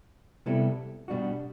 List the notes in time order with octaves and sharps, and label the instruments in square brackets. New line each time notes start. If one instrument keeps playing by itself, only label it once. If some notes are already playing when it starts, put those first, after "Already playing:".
[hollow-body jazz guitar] C3 G3 B3 E4 A4
B2 G3 D4 F#4